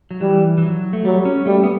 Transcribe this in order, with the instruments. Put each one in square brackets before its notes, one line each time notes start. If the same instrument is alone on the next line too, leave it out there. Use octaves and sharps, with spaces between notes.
[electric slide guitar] F#3
[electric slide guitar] E3 [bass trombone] G3
[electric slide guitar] E3
F#3
A3
[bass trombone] F#3 [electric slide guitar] G3
[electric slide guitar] C#4
[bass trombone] G3 [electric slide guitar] A3
[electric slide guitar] B3